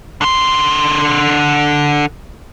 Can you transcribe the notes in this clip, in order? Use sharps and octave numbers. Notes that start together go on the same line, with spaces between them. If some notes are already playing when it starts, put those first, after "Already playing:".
D3 C6